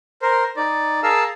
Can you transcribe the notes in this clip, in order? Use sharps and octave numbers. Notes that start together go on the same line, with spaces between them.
A#4 C5
D#4 D5
G#4 A#4 F5 A5 E6